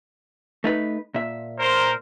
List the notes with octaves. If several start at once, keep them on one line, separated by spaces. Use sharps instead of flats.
A3 D#4 B4
A#2 E5
A#4 C5